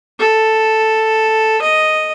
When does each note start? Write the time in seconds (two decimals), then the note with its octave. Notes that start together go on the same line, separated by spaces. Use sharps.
0.20 A4
1.62 D#5